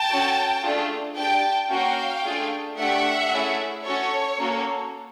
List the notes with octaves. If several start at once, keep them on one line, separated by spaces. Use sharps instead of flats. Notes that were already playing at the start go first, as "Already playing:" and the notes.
Already playing: G5 A5
C#4 F#4 A4
A3 D4 F4 G#4
D4 G4 G5 A5
A#3 C#4 F#4 F5 G5
A3 D4 F4 G#4
A3 D4 G4 E5 F#5
A3 C#4 E4 G#4
C#4 F#4 A4 C#5
A#3 C#4 F#4 A4